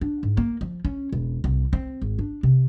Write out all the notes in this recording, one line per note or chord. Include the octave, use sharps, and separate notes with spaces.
D4
G#2
A#3
F3
C#4
E1
C2
C4
G#1
D4
C3